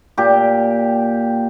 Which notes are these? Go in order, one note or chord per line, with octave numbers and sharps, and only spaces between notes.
A#2 G4